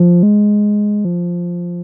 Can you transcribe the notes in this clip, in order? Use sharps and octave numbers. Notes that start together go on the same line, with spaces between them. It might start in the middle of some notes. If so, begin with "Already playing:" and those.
Already playing: F3
G#3
F3